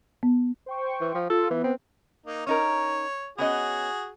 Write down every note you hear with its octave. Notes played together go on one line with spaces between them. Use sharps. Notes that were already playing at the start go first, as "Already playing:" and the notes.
B3
C5 G5 C#6
E3
F3
F4 A4
E3 B3 B4
C4
A#3 D#4
C#4 D#4 A#4 C#5
B3 C#4 F#4 G#4 D#5